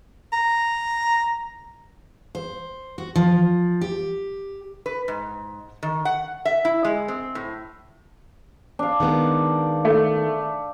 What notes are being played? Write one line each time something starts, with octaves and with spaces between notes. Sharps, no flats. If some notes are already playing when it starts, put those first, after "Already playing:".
A#5
C5
F#4
F3
G4
B4
G#2
D#3
F#5
E5
E4
G#3
C4
A2
D4 F5
D#3 G#3 B3
A3